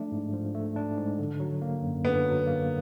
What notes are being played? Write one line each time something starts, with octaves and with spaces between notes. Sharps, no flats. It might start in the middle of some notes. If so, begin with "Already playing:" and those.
Already playing: F3 A3 D4
G#2
F3
A3
D4
G#2
D3
F#3
A#3
F#2
D3 B3
F#3
A#3